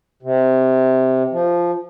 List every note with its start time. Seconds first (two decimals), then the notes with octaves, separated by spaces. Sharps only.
0.23 C3
1.31 F3